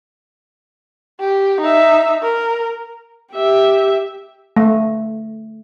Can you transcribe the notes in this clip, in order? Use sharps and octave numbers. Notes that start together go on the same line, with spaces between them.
G4
D#4 E5
A#4
G4 E5
A3